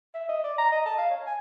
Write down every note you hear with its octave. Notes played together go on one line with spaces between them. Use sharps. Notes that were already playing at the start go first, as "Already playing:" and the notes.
E5
D#5
D5
A#5
D#5
A5
F5
C#5
G#5